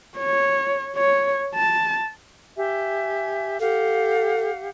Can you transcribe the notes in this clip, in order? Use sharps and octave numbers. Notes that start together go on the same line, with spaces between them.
C#5
C#5
A5
G4 E5 G#5
G4 A4 F5 F#5